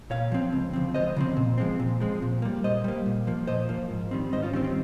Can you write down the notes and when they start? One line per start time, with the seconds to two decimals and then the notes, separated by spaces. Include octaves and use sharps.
0.10 A#2 C#5 F5
0.32 F3 C4
0.53 C#2
0.73 C#3 F3 C4
0.95 C#2 C5 D#5
1.16 C#3 F3 C4
1.37 A#2
1.58 F3 G#3 C4
1.79 A#2
2.00 F3 G#3 C4
2.22 A#2
2.42 G3 A#3
2.64 A#2 C5 D#5
2.84 G3 A#3
3.06 A#2
3.27 F3 A#3
3.47 A#2 C5 D#5
3.69 F3 A#3
3.90 G#2
4.11 D#3 G3 C4
4.32 G#2 C5 D#5
4.43 C#4 F4
4.53 D#3 G3 C4 C#4
4.64 C4